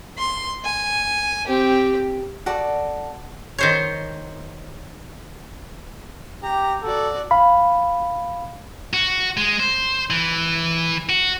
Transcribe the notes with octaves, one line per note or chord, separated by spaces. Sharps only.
C6
G#5
C4 G4
F#4 A4 D5
D#3 C5 C#5
G4 A#5
F#4 A4 D5
F5 B5
F#4
G#3
C5
E3
F#4